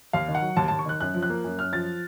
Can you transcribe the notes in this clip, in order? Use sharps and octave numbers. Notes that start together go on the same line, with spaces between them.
D#2 F5
D#3
F#5
F#3
D#2 A5
D#2 A5
C#6
D#3 F#6
F#2 F#6
F3
F#6
A#3
F#2
F#2 F6
F3 A6